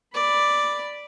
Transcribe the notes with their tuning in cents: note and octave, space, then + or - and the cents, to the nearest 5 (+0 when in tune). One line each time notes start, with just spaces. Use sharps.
D5 +0 B5 +0